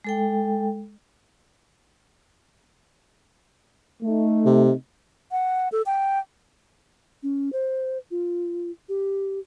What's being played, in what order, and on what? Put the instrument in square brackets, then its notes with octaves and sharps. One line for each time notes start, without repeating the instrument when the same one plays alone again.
[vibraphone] G#3 A4 G5
[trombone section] A3 D#4
[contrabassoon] C3
[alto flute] F#5
A4
G5
[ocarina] C#4
C5
F4
G4